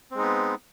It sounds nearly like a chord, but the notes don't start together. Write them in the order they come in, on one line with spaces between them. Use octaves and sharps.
C4 G#3 D#4 B3